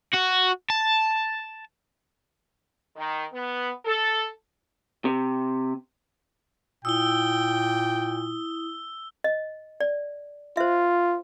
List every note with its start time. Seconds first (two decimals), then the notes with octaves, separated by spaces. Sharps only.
0.14 F#4
0.70 A5
2.97 D#3
3.33 B3
3.85 A4
5.05 C3
6.85 A#2 E4 G5 D#6 E6 G7
9.24 D#5
9.80 D5
10.57 F4 C5 E5